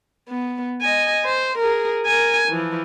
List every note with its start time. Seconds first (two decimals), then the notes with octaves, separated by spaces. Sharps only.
0.28 B3
0.81 D#5 G#5
1.25 C5
1.59 G#4 A#4
2.06 A#4 G#5
2.48 E3 F3